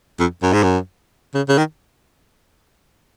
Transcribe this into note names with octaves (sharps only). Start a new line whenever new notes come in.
F2
F#2
G#2
F#2
C#3
C#3
D#3